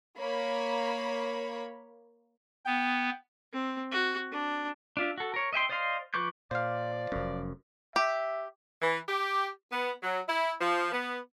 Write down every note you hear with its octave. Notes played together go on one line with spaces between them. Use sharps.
A#3 C#5 B5
B3 G5
C4
F#4
D4
D4 F4 E5
F#4 A4
A#4 C#5
D#5 E5 G5 C6
C5 D5 D#5 F5 C6
F3 B4 C#6 D6 G6
A#2 F3 C5 D5 F5
F1 F#2 C#4
G4 E5
E3
G4
B3
F#3
E4
F3
B3